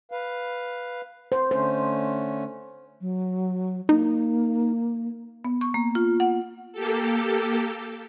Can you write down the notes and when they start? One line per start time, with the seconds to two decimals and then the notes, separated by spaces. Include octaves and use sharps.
0.12 B4 F5
1.32 C5
1.51 D3 A3 C#4 C5
3.01 F#3
3.89 A#3 D#4
5.45 B3
5.61 C#6
5.74 A#3
5.95 F4
6.20 F#5
6.73 A#3 G4 A4